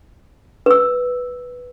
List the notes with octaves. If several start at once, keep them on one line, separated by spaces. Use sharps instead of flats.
B4 E6